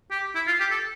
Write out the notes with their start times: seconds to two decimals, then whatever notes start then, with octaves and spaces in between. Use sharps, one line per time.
0.11 G4
0.35 E4
0.47 F4
0.60 G4
0.71 A4